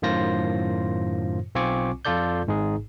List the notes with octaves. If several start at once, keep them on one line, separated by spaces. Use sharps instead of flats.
F#2 A2 D#3 F4 C5 A#6
B1 C4 F4 G#5 C#6 D6
F2 F4 A4 D5 G6
G#1 G#2 D#4 G#4